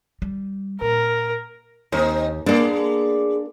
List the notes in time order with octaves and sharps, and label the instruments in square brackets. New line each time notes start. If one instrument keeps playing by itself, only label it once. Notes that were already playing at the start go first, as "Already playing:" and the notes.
[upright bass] G3
[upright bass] A#2 [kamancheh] A#4
[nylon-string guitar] D#2 [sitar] C4 D#4
[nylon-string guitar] A#3 D4 [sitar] B3 G#4 D5